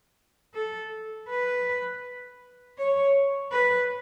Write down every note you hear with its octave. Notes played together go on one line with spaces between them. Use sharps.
A4
B4
C#5
B4